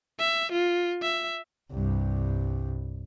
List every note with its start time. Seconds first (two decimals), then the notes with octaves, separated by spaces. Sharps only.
0.19 E5
0.52 F4
1.02 E5
1.72 C2 G2